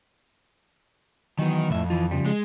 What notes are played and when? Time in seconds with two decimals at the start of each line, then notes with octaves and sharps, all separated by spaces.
1.39 D#3 E3 F#3 B3
1.70 C2 F2 A2 E5
1.90 E3 F4
2.11 C#3 F3 G3
2.26 G#3